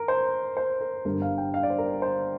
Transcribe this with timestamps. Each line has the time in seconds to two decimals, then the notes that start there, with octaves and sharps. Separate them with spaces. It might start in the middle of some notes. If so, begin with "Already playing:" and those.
Already playing: A#4
0.08 C5
0.57 C5
0.81 A#4
1.05 G1 G2 D3 G3 A#4
1.22 F5
1.38 G5
1.54 F5
1.63 D5
1.70 C5
1.78 A#4
2.02 C5